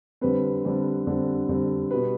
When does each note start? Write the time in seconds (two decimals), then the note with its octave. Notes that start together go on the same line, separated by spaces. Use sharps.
0.21 D3 G3 C4 B4
0.65 D3 G3 C4
1.07 D3 G3 C4
1.49 D3 G3 C4
1.91 B2 G3 B4